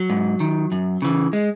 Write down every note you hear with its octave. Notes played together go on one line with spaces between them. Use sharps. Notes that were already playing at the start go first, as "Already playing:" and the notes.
Already playing: F#3
G#2
D#3
F#2
C#3 E3
G#3